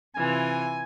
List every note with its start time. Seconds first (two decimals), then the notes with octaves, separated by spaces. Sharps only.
0.15 C3 E3 F4 G#5